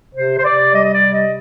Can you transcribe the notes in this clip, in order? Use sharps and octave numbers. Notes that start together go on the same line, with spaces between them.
C3 C5
C5
C3 D5
G3 D#5
D#5
D5
C3
D#5